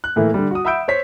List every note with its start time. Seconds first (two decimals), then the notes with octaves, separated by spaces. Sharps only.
0.04 F#6
0.16 A2 E3 A3 A#3
0.34 D3 G3
0.51 F#4 D#6
0.65 E5 F#5 B5 E6 G6 D7
0.88 C5 C#5 B6